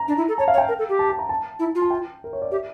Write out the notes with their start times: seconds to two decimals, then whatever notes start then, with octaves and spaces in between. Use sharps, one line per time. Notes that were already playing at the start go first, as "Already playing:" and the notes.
Already playing: A#5
0.08 D4
0.17 E4
0.28 A4
0.38 C#5 A5
0.48 F5
0.53 C#5
0.58 G5
0.68 A#4
0.79 A4
0.89 G4
0.99 A5
1.09 A5
1.19 A#5
1.29 A5
1.59 E4
1.75 F4
1.82 A5
1.90 G5
2.24 A#4
2.33 C#5
2.42 D5
2.51 G4 E5